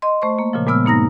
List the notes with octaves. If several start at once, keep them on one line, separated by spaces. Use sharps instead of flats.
D#5 C6
A3 C5 C#6
A#3
A#2 C#3 F3
A#2 G#3 B3 E6 F6
G2 A#3 D#4 A#5 A#6